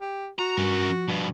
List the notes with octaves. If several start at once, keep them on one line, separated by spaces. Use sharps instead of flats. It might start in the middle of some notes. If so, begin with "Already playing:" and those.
G4
F#4 A#5
G2 C#4 A#4
F3
G2 B2